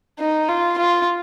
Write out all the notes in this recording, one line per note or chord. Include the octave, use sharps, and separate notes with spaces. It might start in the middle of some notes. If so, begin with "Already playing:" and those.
D#4
F4
F4